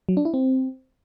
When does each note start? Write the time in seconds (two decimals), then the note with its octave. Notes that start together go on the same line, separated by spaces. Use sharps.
0.09 F#3
0.17 D4
0.25 E4
0.34 C4